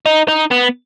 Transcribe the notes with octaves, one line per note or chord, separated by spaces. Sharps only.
D#4
D#4
B3